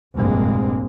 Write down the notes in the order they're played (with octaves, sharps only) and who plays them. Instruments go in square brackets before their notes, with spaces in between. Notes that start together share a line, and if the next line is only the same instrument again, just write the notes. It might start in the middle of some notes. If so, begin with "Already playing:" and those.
[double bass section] F1 A#1 G2 G#3 A#3 C4